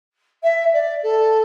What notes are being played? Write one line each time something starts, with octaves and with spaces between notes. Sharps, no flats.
E5
D5
A4